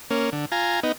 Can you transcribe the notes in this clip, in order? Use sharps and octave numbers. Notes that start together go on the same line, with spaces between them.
A#3 C#4
D3
F4 G#5 A#5
B3 D#4